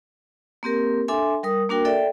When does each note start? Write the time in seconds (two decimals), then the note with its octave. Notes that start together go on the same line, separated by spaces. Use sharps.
0.63 A#3 C4 G4 A#4
1.08 D4 A4 E5 G#5 C6
1.43 G3 A#4 D#6
1.69 A#3 D4 F#4 A#4 G5
1.85 A4 D5 E5 G5